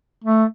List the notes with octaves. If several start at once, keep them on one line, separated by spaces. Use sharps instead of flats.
A3